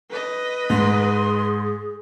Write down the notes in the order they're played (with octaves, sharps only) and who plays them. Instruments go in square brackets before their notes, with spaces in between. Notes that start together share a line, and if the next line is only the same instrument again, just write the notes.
[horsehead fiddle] B4 D#5
[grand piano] G#2 [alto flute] G#4 [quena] C6